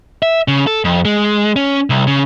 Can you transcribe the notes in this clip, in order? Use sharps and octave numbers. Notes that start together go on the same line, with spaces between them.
E5
C#3
A4
F2
G#3
C#4
C2
C#3